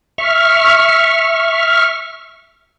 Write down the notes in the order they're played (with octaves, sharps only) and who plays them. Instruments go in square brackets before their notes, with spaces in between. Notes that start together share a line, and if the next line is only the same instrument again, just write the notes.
[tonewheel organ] E5 C#6 F6